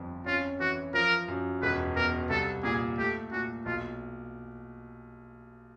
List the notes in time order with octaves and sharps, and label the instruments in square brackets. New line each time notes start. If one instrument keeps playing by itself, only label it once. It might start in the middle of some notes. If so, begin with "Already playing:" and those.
Already playing: [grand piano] G1 F2
[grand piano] C#4 [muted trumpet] F4
[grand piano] E3 [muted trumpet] F#4
[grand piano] F3 [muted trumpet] A#4
[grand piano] F#2
[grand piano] E1 [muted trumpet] B4
[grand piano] E2 [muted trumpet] A#4
[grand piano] C2 [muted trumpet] A4
[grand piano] A#2 [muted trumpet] G#4
[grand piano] A3 [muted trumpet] G4
[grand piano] A#2 [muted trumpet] F#4
[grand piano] B1 [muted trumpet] F4